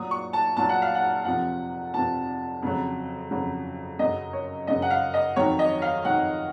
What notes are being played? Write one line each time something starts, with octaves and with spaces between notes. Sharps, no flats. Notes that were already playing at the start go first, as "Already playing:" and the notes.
Already playing: A#2 F#3 D#6
C#6
A5
A#2 F#3 A5
F#5
F5
F#5
F2 C3 F3 F#5
F2 C3 F3 A5
F2 C#3 F#3
F2 C#3 F#3
F#2 C#3 F#3 D#5
C#5
F#2 C#3 F#3 D#5
F#5
F5
D#5
F2 D#3 F#3 C#5
D#5
F5
F2 D#3 F#3 F#5